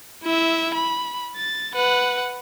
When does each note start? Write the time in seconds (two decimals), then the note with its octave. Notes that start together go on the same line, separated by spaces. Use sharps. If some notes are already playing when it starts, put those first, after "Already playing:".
0.23 E4 E5
0.75 B5
1.36 A6
1.74 B4 F#5